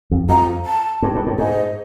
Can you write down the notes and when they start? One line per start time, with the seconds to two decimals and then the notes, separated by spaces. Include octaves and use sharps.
0.11 F2
0.29 F2 A#5
0.66 A5
1.02 G2
1.15 G2
1.27 A2
1.38 G#2 D#5